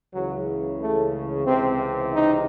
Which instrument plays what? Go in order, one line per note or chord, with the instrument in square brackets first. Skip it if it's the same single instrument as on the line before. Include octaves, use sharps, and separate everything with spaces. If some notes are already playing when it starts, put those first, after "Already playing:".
[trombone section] C#2 C#3 E3 F#3
A3
C#2 C3 E3 C4
D#4